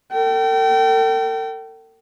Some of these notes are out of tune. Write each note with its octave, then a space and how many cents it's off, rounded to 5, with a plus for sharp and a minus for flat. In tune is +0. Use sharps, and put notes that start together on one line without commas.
A4 +45 G5 -30